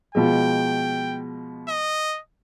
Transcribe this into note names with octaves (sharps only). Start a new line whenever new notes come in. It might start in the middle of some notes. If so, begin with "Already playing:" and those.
B2 F3 G#3 G5
D#5